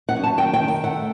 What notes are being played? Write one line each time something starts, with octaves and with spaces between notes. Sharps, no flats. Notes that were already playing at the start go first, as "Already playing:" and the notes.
F#5
F#2
A5
D#3 G5
G5
D#3
G5
A3 F#5